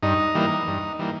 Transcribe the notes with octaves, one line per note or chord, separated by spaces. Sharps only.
G2 D#4
E3 G3 A#3
G2
E3 G3 A#3